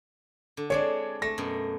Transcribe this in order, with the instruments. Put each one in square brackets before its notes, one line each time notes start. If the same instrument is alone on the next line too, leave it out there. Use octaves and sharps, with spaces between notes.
[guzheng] D3
[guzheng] G#3 C4 D4 [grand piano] C#5 D5
[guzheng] A3 [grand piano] A#6
[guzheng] F#2 B2